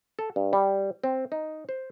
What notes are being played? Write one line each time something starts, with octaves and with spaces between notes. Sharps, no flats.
A4
G2
G3
C4
D#4
C5